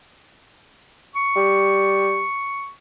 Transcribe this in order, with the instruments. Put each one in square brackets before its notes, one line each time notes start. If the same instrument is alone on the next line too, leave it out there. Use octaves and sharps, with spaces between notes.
[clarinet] C#6
[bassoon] G3